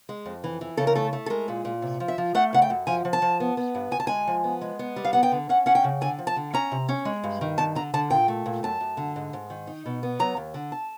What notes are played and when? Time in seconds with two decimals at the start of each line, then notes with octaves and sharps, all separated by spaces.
0.09 G#3
0.25 F2
0.44 E3
0.61 E3
0.77 C#3 A4
0.87 A#4
0.95 A3 A4
1.13 A3
1.26 A4
1.30 G#3 A#4
1.48 A#2
1.65 A#2
1.82 C3
2.00 F3
2.08 E5
2.18 F3
2.35 A3 F#5
2.53 C#3 F#5
2.62 G5
2.70 F#2
2.87 F3 G#5
3.05 F3
3.13 A5
3.22 F3
3.40 B3
3.57 B3
3.75 G2
3.91 D2 G#5
4.00 A5
4.07 G#3 G#5
4.27 F3
4.44 B3
4.61 G#3
4.79 B3
4.96 G3
5.05 F5
5.13 B3 F#5
5.23 G5
5.32 D3
5.49 C#4 F#5
5.66 C#4 F#5
5.75 G5
5.84 C#3
6.01 D3 G#5
6.19 F3
6.27 A5
6.36 D3
6.54 C#4 A#5
6.72 C3
6.89 C#4
7.05 G#3
7.23 G2
7.41 D#3
7.58 G2 A5
7.75 D3 A#5
7.94 D3 A5
8.10 A#2 G5
8.28 A3
8.46 A#2
8.63 F#2 A5
8.80 F#2
8.97 D3
9.16 G#2
9.33 G#2
9.50 D#3
9.67 D#4
9.86 B2
10.03 B3
10.19 F#3 A#5
10.37 D#2
10.54 D3
10.72 A5